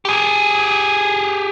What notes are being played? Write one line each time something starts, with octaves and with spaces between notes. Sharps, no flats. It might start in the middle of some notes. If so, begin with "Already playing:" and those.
G4 G#4